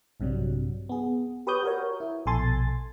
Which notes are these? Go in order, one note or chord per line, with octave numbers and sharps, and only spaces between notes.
A#1 G2 C3 F#3 G3
B3 G#4
G4 B4 C#5 D#6 G6
F#4 A#4 C#5
E4
A#1 B2 A4 G#5 C6 A6